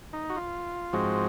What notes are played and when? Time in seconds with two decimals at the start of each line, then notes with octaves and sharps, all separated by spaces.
0.13 D#4
0.30 F#4
0.37 F4
0.93 G#2 F3 G#3 C4 F#4